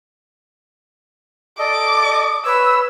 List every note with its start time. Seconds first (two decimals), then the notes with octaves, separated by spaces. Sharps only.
1.59 A4 D5 D#5 D6
2.45 B4 C#5 E6